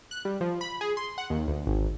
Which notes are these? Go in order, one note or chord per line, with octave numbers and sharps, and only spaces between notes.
F#6
G3
F3
B5
G#4
C6
F#5
D#2
D2
G#1